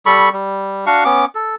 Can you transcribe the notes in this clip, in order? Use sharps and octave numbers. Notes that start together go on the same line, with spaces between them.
G3 A4 B5 C#6
G3
D4 F#4 F5 C#6
B3 C#4 D6
A4